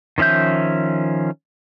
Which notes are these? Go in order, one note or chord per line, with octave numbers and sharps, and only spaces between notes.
D#3 F3 C#4 E5 G6